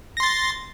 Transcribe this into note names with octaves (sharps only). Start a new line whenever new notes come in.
C6 A6 A#6